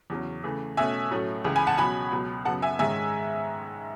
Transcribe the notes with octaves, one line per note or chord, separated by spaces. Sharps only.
E2 C#3 F#3 C#4
C#3 E3 A3
B2 A3 C#4 E5 G#5
A2 F#3 A3 C#4
C#2 C#3 E3
G#5 B5
F#5 A5
B2 F#3 C#4 G#5 B5
C#2 B2 F#3
F#2 C#3 F#3 B3 F#5 A5
E5 G#5
G#2 D#3 G#3 C#4 E5 G#5